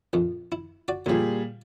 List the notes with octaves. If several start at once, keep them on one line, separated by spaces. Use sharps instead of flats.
A#1 F2
E4
F#4 D5
D2 A#2 F3 G3 G#4